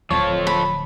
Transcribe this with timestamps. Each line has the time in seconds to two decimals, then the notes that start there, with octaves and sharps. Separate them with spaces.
0.10 D1 D3 F3 A4 C#5
0.47 B5